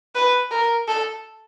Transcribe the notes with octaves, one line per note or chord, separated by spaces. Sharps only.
B4
A#4
A4